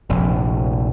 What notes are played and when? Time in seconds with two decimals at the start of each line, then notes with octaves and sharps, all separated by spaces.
0.10 F1 A#1